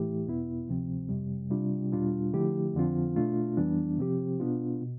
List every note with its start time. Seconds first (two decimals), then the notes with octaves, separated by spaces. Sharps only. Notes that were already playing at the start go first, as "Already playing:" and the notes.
Already playing: A2 E3 A3 E4 G4
0.26 E2 B2 B3 E4
0.68 D2 C3 F3 C4
1.09 F2 C3 G3
1.50 C3 G3 D4 F4
1.92 E2 B2 G3 D4 F4
2.33 D3 F3 A3 E4 G4
2.74 F2 D3 F3 C4 F4
3.16 B2 A3 D4 F4
3.57 F2 E3 G3 B3 D4
3.98 C3 F3 C4 G4
4.40 B2 B3 D4 F4
4.82 B2